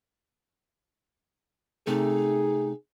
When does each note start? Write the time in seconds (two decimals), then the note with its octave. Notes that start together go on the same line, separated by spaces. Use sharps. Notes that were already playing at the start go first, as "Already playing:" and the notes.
1.87 C3 A3 D#4 G#4